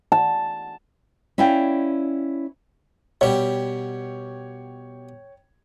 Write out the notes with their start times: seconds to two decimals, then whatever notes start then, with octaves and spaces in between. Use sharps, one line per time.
0.12 A5
1.38 C#4 E4 D5 F5 G5
3.21 B2 G3 C#5 G5